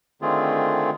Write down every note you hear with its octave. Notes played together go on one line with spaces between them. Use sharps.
D3 D#3 A3 C4 F4 G#4